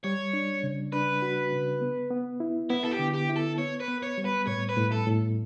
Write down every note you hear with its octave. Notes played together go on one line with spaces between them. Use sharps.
G3 C#5
D4
C#3
D4 B4
F#4
C#3
B3
B3
E4
B3 E4
A4
G4
D3
G4
E4
A4
B3 C#5
B4
B3
C#5
G3
B4
A2 C#5
B4
A2
A4
A2